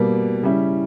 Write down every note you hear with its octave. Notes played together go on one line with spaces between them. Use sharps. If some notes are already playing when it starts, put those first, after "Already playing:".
Already playing: B2 G3 A#3
C#3 G3 C#4 E4